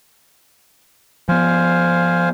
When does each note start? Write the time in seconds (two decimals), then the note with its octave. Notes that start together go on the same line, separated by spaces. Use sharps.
1.29 F3 B3 C5 F5 G#5